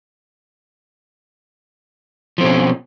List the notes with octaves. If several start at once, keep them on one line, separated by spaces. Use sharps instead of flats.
B2 F3 C4 C#4